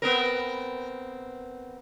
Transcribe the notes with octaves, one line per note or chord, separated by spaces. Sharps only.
B3 C4 A#4